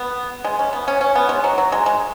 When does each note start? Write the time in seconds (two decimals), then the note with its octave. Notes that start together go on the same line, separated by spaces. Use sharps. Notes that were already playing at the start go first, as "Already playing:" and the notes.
Already playing: B3
0.45 G#3
0.59 C#4
0.73 B3
0.88 C#4
1.01 C#4
1.15 B3
1.29 G#3
1.44 F#3
1.58 F#3
1.72 G#3
1.86 G#3